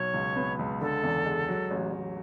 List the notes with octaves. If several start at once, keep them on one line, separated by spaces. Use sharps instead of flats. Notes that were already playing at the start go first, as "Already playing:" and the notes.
Already playing: B1 C#5
C#2
B3
C#2
D3 A4
E2
G#3
F#3
A1
A1